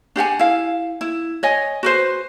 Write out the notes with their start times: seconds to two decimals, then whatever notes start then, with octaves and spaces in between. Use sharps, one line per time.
0.16 D4 G4 F#5 G#5
0.39 E4 F5
1.01 E4
1.43 C#5 D#5 G#5
1.83 F#4 B4 C5